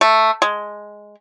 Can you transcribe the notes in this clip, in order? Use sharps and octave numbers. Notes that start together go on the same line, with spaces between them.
A3
G#3